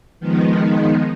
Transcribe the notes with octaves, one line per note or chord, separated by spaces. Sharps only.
D#3 F3 G#3 B3 D#4